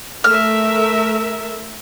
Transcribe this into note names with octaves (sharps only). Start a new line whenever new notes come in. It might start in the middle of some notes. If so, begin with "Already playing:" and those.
A3 A#4 E5 F6